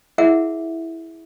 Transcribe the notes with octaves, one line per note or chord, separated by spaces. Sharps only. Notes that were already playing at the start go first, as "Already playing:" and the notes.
E4 G#4 A#4 E5 F#5